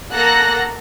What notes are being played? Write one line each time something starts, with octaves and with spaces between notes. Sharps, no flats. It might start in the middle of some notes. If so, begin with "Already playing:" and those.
A#3 A4 F#5 A#5 F#6 A#6